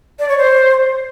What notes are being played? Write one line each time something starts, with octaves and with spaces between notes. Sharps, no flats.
D5
C#5
C5